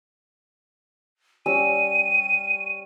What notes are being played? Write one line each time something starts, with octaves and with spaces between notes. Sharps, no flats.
G3 C#4 E6 D#7